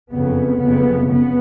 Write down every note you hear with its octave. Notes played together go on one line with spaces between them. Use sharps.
F#1 F2 C#3 B3
F#1 F2 C#3 B3
C#3 B3